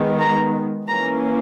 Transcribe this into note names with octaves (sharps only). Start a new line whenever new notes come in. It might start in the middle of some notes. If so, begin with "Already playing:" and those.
Already playing: D#3 G#3 B3
A#5
E3 A#3 C#4 A#5